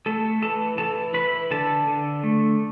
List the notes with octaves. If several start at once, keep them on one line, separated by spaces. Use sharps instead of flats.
A3 A4 A5
E3 A4 A5
E3 A4 A5
E3 B4 B5
D3 A4 A5
D3
A3